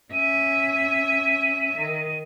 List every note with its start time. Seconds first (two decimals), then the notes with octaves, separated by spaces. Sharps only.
0.12 C#4 E5 D#7
1.78 D#3